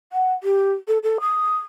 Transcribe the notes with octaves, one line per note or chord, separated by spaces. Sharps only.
F#5
G4
A4
A4
D#6